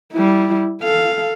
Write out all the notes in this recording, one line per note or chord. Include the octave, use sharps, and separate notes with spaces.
G3 E4
A4 F5